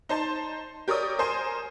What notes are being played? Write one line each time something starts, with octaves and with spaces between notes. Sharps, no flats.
D#4 C5 A5 C6
G4 A#4 C#5 D5 D#6
A#4 C5 G#5 C6